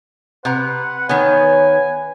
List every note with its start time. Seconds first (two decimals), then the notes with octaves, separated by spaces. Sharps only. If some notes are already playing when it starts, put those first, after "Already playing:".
0.45 C3 B4 F#5 A#5
1.09 D#3 B3 C#5 G#5